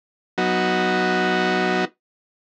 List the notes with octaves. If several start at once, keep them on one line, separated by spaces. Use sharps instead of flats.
F#3 B3 D#4 F#4